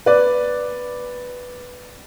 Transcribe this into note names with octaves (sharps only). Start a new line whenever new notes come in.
B4 D5